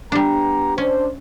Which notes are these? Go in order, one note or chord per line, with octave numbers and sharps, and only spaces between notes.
G3 B3 D4 G4 A#5
C#4 D4 C5